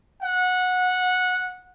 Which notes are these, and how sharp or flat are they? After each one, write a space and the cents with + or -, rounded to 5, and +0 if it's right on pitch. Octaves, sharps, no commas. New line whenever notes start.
F#5 -15